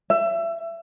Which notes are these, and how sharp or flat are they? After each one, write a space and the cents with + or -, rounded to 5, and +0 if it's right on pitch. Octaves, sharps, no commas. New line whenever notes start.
E5 +25